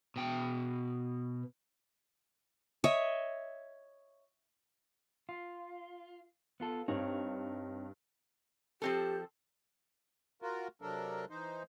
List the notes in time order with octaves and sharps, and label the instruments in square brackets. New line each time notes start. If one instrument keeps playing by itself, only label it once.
[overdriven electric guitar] B2 G5
[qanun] C#5 D#5 E5
[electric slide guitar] F4
B3 F4 A4
[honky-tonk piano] G2 [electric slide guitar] C4 D#4 C#5
[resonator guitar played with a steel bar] F3 C4 A4 [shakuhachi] G4
[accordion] F4 F#4 A#4
C3 F#3 D4 A4 A#4
E3 D#4 C5